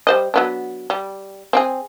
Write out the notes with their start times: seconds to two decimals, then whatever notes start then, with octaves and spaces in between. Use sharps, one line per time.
0.07 G3 C5 D#5
0.34 F#3 B3 D4
0.90 G3
1.53 C4 G4 G#4